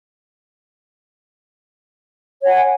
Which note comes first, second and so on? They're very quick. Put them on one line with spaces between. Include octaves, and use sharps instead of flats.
C#5 F#5 G#5